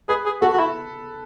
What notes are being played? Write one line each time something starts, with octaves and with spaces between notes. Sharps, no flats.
G#4 B4
G#4
F#4 A4
F#4
E4